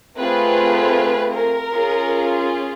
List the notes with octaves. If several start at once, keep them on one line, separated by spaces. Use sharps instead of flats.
A3 C4 F4 G#4 B4
A#4
C#4 F4 G#4